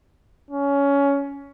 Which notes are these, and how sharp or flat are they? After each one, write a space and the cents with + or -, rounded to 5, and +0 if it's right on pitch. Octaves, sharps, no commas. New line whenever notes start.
C#4 +20